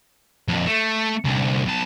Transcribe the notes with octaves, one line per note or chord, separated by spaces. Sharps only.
F2 A#2
A3
C2 D3
B1 A5